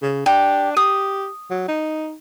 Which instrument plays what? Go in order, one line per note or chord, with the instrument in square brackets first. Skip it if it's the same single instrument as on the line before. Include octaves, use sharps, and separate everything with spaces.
[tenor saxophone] C#3
[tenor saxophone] D4 [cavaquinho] G4
[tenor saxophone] G4 [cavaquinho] D#6
[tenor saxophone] F#3
D#4